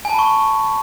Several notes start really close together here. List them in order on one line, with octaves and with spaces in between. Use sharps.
G#5 A5 B5 C#6